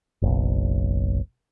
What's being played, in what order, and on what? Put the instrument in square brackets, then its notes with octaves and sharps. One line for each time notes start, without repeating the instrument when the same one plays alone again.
[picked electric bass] F#1 B1